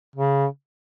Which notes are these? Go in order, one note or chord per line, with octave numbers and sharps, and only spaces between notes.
C#3